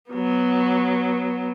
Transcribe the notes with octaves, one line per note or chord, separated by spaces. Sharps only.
F#3 B3